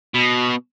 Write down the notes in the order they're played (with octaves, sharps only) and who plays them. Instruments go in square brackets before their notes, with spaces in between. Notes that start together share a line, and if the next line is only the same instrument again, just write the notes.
[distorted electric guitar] B2